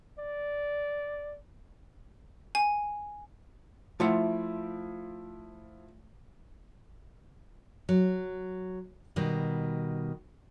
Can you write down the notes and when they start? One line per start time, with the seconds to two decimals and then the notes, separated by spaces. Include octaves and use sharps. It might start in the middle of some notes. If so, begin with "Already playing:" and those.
0.19 D5
2.55 G#5
4.00 F3 A3 E4 F4 F#5
7.89 F#3
9.16 B2 D#3 G3